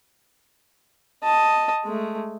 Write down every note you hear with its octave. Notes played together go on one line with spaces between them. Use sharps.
D#5 A5
G#3 A3